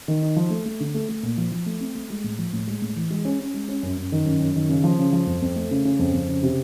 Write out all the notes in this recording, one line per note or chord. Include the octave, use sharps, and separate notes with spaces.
D#3
D#4
F3
A3
A3
D3
A3
A3
A#2
F3
F3
A3
C4
A3
G#3
A2
F3
A2
G#3
A2
E3
G#3
C#4
C#4
G#3
C#4
F#2
F#2
D#3
F#2
F#2
D#3
C#3
F3
C#3
F3
F2
F2
A3
C#3
C#3
F2
F2
C#3
C3